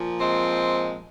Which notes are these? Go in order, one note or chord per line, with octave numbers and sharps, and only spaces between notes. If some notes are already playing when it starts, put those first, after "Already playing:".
Already playing: A#2 F3
G#3 C4